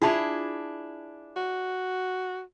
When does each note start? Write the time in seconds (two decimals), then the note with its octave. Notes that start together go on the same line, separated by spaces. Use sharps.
0.02 D4 E4 F4 G#4 A5 B5
1.37 F#4